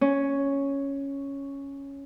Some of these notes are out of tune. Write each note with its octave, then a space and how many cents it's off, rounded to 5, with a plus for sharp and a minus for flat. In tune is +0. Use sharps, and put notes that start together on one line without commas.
C#4 +0